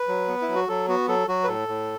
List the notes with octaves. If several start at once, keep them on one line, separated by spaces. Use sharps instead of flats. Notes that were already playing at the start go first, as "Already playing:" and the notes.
Already playing: B4
F#3
B3
E4
F#3
F#4
F#3 A4
B3 F#4
F#3 A4
F#3 F#4
B4
A2 A4
A2